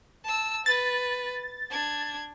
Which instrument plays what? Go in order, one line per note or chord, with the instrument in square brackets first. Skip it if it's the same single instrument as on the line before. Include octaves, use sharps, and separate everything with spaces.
[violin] A5 E6
[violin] B4 [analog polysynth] A6
[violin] D4 G#6